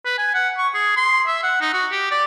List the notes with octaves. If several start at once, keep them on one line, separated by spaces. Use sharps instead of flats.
B4
G#5
F#5
C#6
G#4
C6
E5
F#5
D#4
F#4
G4
D5